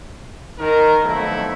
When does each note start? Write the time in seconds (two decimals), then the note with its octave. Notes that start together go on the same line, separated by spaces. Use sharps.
0.58 D#3 A#4
1.04 B1 F2 F#3 A3 E4